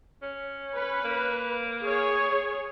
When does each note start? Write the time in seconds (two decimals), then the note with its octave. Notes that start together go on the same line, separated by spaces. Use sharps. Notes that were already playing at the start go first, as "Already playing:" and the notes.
0.22 C#4
0.76 B4
1.04 A#3
1.85 G#4 C#5